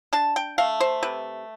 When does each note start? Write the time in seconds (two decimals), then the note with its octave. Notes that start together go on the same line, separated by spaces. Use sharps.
0.13 D4 A5
0.36 G5
0.58 A3 F5
0.80 C5
1.03 C3 B4